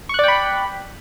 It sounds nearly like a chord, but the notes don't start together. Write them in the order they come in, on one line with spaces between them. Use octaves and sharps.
C#6 F#6 D5 G5 B5